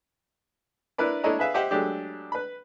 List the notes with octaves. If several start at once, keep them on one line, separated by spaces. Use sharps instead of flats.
D4 E4 A#4 B4 D5
D4 E4 A4 C#5 D#5 A#5
G#4 B4 E5 F5
G4 C5 D#5 E5 F#5
F#3 G#3 A3 D4 G4
B4 B5